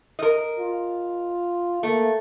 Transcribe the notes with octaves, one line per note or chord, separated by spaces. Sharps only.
A#4 D#5
F4
A3 A#3